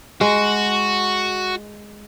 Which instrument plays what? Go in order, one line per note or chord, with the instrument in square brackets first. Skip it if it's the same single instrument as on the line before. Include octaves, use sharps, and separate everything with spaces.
[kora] G#3 [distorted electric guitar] F#4